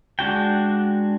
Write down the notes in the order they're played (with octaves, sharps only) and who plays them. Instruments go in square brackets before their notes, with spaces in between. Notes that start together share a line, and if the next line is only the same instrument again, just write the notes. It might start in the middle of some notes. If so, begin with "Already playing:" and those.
[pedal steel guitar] G#3 D4 F#4 G5